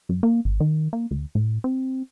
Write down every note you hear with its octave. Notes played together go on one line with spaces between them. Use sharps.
F#2
A#3
G#1
D#3
A#3
D2
A2
C4